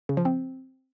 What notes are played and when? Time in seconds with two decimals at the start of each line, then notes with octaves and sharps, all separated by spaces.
0.09 C#3
0.17 F3
0.25 C4